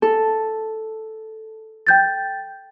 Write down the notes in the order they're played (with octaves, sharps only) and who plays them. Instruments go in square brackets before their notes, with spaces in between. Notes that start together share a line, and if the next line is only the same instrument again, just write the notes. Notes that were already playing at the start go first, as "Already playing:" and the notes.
[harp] A4
[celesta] G5 G6 A6